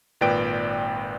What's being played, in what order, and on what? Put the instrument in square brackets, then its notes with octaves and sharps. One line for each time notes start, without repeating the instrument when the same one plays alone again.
[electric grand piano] G#1 A#2 B4 D5 G5 D7